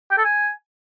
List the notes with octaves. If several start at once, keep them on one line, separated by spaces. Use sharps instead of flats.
G5
A4
G#5